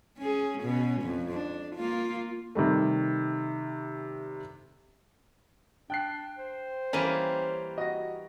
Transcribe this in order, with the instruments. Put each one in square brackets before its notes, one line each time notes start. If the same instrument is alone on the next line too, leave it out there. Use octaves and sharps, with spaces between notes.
[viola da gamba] C#4 G#4
B2 C#4
F2
D4
A#3 F4
[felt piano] C3 D#3 G3 A3
[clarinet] D4 [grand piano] G5 F#6 C7
[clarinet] C5
[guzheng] E3 G3 A#3 [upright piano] C#4 D#7
[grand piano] F#4 [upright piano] D#5 A#6